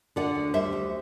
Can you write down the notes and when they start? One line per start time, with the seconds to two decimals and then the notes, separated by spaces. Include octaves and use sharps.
0.16 D3 D5 F#5
0.35 D2
0.54 G3 C5 E5
0.72 D2